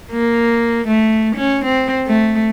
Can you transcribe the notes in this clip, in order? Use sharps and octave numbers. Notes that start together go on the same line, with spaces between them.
A#3
A3
C#4
C4
A3